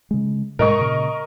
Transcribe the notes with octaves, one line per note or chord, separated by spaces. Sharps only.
C#3 G#3
G#2 B2 G#3 A#4 D#5 C#6
A#2 C#3